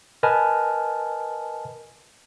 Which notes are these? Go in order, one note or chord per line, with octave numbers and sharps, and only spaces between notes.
A#4 B4 D#5 G#5 A5 F6